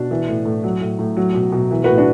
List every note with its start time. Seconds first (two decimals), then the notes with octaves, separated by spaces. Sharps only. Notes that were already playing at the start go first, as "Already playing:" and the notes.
Already playing: B2 D4
0.11 E3
0.28 A2
0.45 A2
0.64 F#3
0.81 A2
0.99 A2
1.17 F#3
1.35 B2
1.52 B2
1.71 E3
1.84 F#4 B4
1.88 A2
1.98 D4 F#4